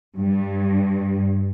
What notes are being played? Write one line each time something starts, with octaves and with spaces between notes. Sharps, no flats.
G2